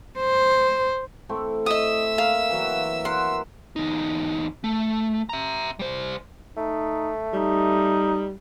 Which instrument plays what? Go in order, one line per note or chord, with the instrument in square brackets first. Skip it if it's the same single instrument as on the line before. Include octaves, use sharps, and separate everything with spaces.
[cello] C5
[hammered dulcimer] A3 C4 E4
[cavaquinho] D#5 D#6 [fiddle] E5 E6
[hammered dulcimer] A#3 [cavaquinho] F5
[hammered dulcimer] E3 F#3 F#4
[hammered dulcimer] A#4 F#5 [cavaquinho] C6
[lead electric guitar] E2 D#4
A3
E5 A#5
G3 C5
[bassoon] A3 [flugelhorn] D#4
[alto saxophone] G3 [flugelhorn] D#4